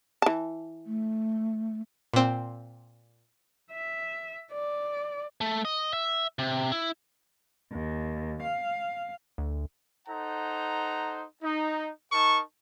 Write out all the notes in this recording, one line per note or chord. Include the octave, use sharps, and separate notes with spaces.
E3 A5
A3
A#2 C4
E5
D5
A3
D#5
E5
C3
E4
D#2
F5
D2
D#4 A4 C5 F#5 A#5
D#4
D#4 A#4 A5 C#6